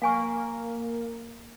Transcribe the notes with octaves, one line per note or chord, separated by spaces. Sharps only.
A#3 F5 G#5 C#6